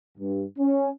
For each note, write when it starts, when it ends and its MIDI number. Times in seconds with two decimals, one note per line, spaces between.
0.18 0.44 43
0.58 0.89 61